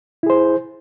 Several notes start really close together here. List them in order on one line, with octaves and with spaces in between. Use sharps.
E4 G#4 C5